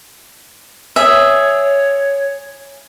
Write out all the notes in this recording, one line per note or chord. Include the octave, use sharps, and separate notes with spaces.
G#4 C#5 E5